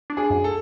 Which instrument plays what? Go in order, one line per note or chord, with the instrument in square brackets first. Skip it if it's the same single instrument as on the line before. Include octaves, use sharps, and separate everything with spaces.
[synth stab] D4
[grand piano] G#4
[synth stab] F#2
[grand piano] A4